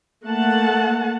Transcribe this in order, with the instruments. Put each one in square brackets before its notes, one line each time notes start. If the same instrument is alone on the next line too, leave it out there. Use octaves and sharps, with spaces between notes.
[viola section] A3 A#3 F#5 A5